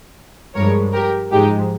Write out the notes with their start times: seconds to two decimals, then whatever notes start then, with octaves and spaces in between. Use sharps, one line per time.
0.55 G2 F3 G#3 A#4 C#5
0.93 G4 A#4
1.31 G#2 F3 G#3 D#4 G4